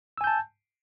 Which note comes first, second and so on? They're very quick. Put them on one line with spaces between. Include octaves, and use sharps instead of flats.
E6 G#5 G6 A5